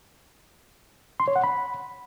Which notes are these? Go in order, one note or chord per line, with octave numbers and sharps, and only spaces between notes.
C6
C#5
F#5
B5